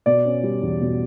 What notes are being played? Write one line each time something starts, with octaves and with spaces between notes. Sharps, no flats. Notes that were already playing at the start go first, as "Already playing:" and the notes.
B2 D5
C#4
G3
E2
B2